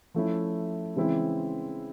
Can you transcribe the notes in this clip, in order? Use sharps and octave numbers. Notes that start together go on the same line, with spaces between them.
F3 A3 C#4 E4
C#3 E3 G#3 C4 E4